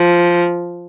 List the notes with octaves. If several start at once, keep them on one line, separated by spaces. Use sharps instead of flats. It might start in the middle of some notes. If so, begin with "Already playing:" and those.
Already playing: F3